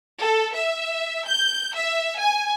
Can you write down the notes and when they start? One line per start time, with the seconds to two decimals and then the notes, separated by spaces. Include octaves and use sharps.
0.20 A4
0.53 E5
1.26 G6
1.74 E5
2.18 G#5